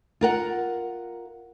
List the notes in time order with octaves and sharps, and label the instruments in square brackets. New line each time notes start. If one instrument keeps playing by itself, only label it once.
[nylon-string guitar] F4 A#4 F#5